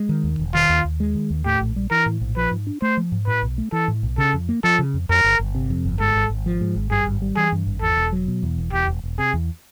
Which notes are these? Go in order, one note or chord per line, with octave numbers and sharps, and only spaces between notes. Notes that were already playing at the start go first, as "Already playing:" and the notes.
Already playing: G#3
D#3
D#2
E1
D#3 F4
D#2
D#2
G#3
D#3
D#2
A2 G4
A#1
G3
E3 A#4
A2
A#1
F3 B4
G#2
D4
A3 C5
F3
G#2
A2 B4
B1
A3
E3 A4
A2
B1
C#3 A4
F2
A#3
F3 A4
C#3
F2
F2 A#4
G1
G1
C3
F2
G1
G#2 A4
G#1
G#1
F3
G#2
G#1
G2 G#4
G#1
G3
E3 G#4
G2
G#1
E2 A4
E1
F#3
B2
E2
E1
E2 G4
E1
E1
C3 G#4
E2